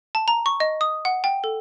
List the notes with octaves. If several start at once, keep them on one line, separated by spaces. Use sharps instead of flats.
A5
A#5
C#6
D#5
D#6
F#5
G5
A4